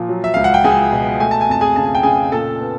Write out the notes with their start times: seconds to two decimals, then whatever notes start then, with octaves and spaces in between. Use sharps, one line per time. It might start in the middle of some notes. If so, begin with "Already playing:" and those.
Already playing: A#2 F3
0.09 F#3
0.24 E5
0.34 C#2 F5
0.44 F#5
0.54 G5
0.64 C#2 G#4 G#5
0.92 B2
1.20 A3 G#5
1.31 A5
1.41 G#5
1.49 F2 A5
1.61 G#4 G#5
1.76 C#3 A5
1.86 G#5
1.95 G5
2.03 C#3 G#4 G#5
2.32 A#2 A4 A5
2.60 B3